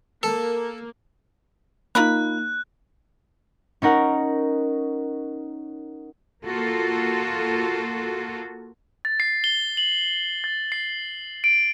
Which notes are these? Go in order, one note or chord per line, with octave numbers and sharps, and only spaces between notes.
A#3 A4
A#3 D#4 F4 A#4 B5 F#6
C#4 D#4 A#4 F#5
A#3 F4 F#4 A4
A6
C7
G7
F#7
A6
C7
D7